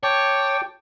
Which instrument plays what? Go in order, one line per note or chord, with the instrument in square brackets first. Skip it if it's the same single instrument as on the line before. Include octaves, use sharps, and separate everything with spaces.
[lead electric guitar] C#5 [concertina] G5 A5 D6